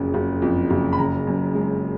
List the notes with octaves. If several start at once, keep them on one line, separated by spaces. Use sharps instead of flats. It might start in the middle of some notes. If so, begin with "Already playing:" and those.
Already playing: F#1 F2 C#3
F#1
F2
F#1
B5
C#3 A#5
F#2
G#3